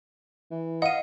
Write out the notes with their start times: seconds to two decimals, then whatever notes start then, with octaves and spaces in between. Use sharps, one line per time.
0.51 E3
0.82 D#5 F5 F#5 D#7